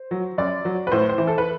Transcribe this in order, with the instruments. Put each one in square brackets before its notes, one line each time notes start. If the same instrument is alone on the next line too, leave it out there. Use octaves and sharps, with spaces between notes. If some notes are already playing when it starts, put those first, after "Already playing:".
Already playing: [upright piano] C5
F#3
F#2 D5
F#3
B4
A2 C5
C5
E3
A4
B4